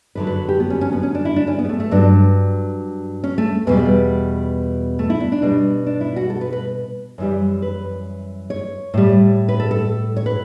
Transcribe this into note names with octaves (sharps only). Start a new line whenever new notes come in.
F#2 D3 F#3 B4
B4
G4
B3
C#4
C#4
B3
C#4
D4
E4
D4
C#4
B3
G3
A3
A3
G2 F#3 D4
C#4
A3
E2 B2 G3 B3
A3
E4
D4
D4
B2 G3
D4
E4
F#4
A4
B4
B4
F#2 E3 G3
B4
C#5
A2 G3
B4
A4
A4
C#5
B4